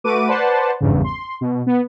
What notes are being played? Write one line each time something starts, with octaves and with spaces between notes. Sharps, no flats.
A3 F#4 B4 D6 D#7
B4 C5 D5 F#5 A5 C6
G#1 E2 G2 C#3
C6
B2
B3